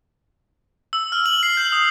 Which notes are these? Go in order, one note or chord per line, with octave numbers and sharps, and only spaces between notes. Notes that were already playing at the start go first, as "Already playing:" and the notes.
E6
F6
F#7
C7
G6
D#6